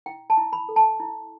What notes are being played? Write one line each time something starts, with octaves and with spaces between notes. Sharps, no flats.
E4 G5
A5
E4
B5
A4
A5
E4